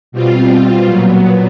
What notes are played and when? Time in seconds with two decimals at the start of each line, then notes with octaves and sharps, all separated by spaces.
0.12 B2 G3 C4 F4
0.85 A#2 F#3 B3